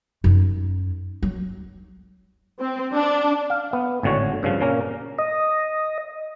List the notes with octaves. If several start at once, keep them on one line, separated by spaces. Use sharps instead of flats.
F#2 D#4
F#3
C4
D4
F5
B3
G#1 A2 D3 F#4 C#5
G2 C#3 F3
A#2 A#3 C#4 A#4
D#5